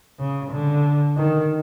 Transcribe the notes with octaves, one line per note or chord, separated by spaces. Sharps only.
C#3
D3
D#3